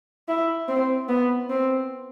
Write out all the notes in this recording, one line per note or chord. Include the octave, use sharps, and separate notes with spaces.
E4
C4
B3
C4